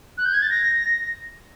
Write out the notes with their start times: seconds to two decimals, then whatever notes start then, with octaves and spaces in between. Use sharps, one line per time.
0.18 F#6
0.25 G6
0.34 G#6
0.42 A6
0.50 A#6